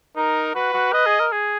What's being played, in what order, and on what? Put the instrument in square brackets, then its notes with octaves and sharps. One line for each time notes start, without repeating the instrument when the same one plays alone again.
[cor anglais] D#4 [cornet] A#4
[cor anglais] F#4 [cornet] B4
[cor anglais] F#4
[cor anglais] B4 [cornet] D#5
[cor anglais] G#4
A#4
G#4